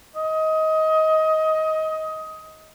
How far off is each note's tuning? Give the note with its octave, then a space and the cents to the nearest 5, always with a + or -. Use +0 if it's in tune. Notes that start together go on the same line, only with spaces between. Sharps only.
D#5 +20